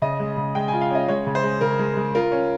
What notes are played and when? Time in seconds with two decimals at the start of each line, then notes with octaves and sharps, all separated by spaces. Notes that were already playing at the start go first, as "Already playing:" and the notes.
0.02 C#3 D#5
0.19 G#3
0.37 C#3
0.55 G#3 G5
0.68 G#5
0.73 F4
0.81 F5
0.91 C#4 D#5
1.08 G#3 C#5
1.27 C#3
1.35 C5
1.44 G#3
1.61 C#3 A#4
1.79 G#3
1.97 G#3
2.15 F4 A#4
2.32 C#4